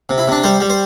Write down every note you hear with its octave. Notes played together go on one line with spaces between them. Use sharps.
C3
E4
C3 D4
G3 C5
G3
C5